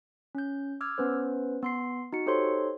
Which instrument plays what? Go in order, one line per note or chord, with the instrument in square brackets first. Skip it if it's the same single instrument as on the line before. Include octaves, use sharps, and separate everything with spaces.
[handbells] C#4 G6
D6 E6 F6 G#6
B3 C#4 B4 C5
B3 C6 C7
D#4 F#4 C#7
D#4 G4 A4 C5 C#5 C6